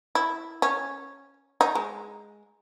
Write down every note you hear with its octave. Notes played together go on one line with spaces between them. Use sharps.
E4
C#4
D#4
G#3